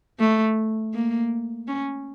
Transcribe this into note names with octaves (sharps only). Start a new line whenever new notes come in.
A3
A#3
C#4